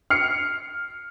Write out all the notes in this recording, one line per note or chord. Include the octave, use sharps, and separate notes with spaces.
F6 C7 C#7